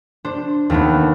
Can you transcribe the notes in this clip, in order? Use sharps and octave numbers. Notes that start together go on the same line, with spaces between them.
D4 C5
D#2 A3 B3